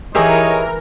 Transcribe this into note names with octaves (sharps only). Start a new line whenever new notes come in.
E3 D#4 G4 G#4 A#4 C#5 D#5 E5